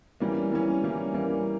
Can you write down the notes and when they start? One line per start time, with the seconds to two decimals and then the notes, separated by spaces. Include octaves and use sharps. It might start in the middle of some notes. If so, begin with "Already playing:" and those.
0.20 E3 G3 A#3 C#4
0.52 E3 G3 A#3 C#4
0.82 E3 G3 A#3 C#4
1.13 E3 G3 A#3 C#4